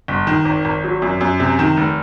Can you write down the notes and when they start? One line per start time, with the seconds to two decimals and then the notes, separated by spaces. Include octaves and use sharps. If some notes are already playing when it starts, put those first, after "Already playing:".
0.08 G1
0.27 D#3
0.45 G#1
0.65 G#1
0.84 F#3
1.02 F#2
1.21 F#2
1.40 C3
1.59 D#3
1.77 F1